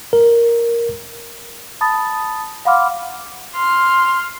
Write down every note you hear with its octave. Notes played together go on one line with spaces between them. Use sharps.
A#4
A5 B5 D#6 A6
F5 F#5 B5 C6 D6 F6
C6 F6